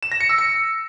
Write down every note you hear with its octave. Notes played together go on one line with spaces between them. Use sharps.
E7
A#6
C#7
E6
C#7